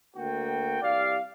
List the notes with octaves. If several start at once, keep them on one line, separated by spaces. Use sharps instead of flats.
D2 A#3 F#4 G5
C2 G4 D5 F5